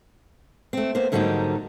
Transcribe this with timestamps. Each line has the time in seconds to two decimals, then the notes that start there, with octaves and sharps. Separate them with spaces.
0.73 A3 C4
0.95 A#3 B3 C5
1.12 G#2 D3 F#3 G3 A#3 D#4